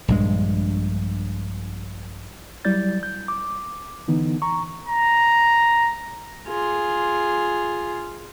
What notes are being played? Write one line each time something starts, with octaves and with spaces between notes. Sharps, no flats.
A#1 G2 G#3
F#3 G3 E4 D5 G6 A6
G6
D6
D3 E3 B3 D#4
A#5 C#6
A#5
F4 G#4